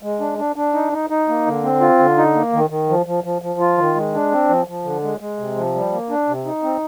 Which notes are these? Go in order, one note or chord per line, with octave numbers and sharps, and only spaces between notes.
G#3
D4
D4
D4
D#4
D#4
D#4
A#3
D3
C4
F4
D3
D#4
A#3
D#3
D#3
F3
F3
F3
F3
F4
D#3
G#3
D4
C4
F3
F3
D3
G#3
G#3
C3
F3
G3
A#3
D4
C3
D#4
C4